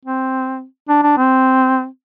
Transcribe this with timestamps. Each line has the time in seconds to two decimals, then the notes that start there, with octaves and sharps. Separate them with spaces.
0.05 C4
0.89 D4
1.03 D4
1.17 C4